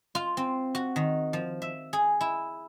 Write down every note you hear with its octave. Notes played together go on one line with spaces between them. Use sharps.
F4
C4
F#4
D#3
F3
E5
G#4
E4